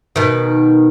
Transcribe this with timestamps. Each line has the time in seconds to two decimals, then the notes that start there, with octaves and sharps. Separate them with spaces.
0.16 B2 D#3